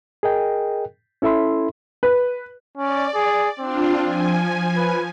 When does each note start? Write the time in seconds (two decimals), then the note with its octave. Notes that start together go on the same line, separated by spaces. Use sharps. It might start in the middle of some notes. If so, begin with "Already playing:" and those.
0.23 G#4 A#4 D#5 G5
1.22 C#4 E4 A4 E5 B5 C6
2.03 B4
2.78 C#4 D5
3.15 G#4
3.59 C4 D4 F4
4.04 F3 G#5
4.76 B4